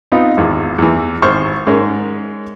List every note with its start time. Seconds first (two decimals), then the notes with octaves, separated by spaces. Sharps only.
0.12 B3 C4 D#4 F4
0.37 G#1 E2
0.78 E2 E3
1.22 G#1 C5 C#6 F6
1.67 G#2 G#3 C#4 A#4